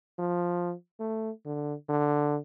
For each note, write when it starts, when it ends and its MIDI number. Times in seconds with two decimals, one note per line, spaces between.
0.18 0.74 53
1.00 1.30 57
1.46 1.74 50
1.89 2.38 50